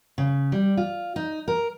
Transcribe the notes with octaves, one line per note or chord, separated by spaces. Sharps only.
C#3
G3
F4
D#4
A#4